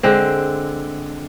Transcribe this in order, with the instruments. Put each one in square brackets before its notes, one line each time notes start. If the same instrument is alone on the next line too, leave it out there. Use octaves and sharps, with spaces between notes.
[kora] D3 G#3 C4